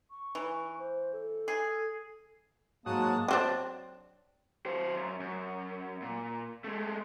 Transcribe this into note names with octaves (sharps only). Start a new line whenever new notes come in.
C#6
E3
C5
A4
G#4
G#2 F#3 G#3 A#3 F#4 A5 D#6
F#3 C4 D4
F#3 C5
F#2
F#2
A#2
G#3 A3